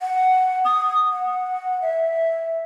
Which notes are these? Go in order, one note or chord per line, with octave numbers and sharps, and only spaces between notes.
F#5
D#6
F#5
E5